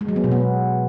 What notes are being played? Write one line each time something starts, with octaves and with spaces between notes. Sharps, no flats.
G#3
F#3
B3
B2
B3